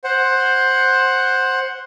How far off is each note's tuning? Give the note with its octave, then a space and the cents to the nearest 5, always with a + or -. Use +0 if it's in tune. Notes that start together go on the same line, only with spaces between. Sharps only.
C5 +10 F#5 +0